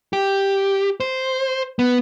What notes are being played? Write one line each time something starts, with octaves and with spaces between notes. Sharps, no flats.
G4
C5
B3